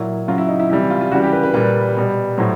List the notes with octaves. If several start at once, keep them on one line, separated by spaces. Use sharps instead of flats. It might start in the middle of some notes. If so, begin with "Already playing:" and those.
Already playing: A#2 F#3 E4
C#3 F#3 F4
E4
D#4
E4
C3 E3 G3 E4
E4
F4
F4
C#3 E3 G3 F#4
G4
B4
B4
A#2 G3 B4
B2 G3
A2 F#3 C5